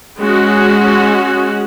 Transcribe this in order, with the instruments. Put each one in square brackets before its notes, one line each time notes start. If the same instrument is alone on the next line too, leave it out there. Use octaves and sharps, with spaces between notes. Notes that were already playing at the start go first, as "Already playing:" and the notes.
[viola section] G#3 C#4 F#4